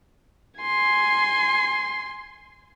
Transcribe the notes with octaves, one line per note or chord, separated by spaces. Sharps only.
G#5 C6